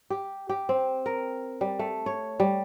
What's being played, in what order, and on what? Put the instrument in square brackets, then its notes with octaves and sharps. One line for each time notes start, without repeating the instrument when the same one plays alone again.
[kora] G4
G4
C4
A#4
G3
A3
C#5
G3